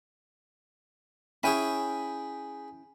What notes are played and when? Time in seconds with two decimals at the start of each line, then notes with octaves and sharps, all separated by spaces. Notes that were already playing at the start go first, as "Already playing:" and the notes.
1.43 C#4 E4 G#4 G5 G#5 B5